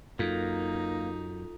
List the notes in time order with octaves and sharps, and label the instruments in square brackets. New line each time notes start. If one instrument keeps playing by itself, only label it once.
[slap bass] F#2 [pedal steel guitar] A#3 [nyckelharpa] D#4 [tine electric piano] F4 A4 B6